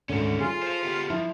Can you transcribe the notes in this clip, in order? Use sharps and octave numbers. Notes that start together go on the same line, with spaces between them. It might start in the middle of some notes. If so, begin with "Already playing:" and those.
D2 G#2 D3 D#3 C#4
F4 G#4
C5 F5
B3 G4
F3 E4